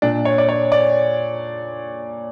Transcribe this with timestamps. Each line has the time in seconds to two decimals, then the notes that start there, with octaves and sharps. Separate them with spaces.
0.02 A#2 D4
0.25 C#5
0.38 D5
0.49 C#5
0.72 D5